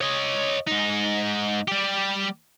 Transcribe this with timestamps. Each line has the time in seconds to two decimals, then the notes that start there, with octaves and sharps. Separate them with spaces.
0.01 C#5 D#5
0.67 G#2 D#4
1.68 G3 G4